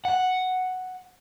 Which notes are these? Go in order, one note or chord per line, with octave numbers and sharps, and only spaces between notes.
F#5